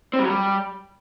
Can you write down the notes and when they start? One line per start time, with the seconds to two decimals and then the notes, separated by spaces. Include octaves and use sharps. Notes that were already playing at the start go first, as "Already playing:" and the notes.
0.13 C4
0.19 G3
0.25 F#3
0.30 G3